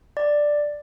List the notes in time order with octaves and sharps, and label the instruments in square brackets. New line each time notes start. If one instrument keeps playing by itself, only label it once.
[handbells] D5